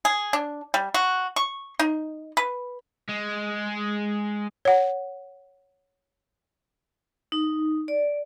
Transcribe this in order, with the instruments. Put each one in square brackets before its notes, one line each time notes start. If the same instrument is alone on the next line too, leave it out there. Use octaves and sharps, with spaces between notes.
[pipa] G#4
D4
G3
F#4
C#6
D#4
B4
[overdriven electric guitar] G#3
[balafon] C#5 F#5
[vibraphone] D#4
D5